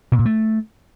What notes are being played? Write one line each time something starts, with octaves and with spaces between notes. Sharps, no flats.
B2
A#2
A3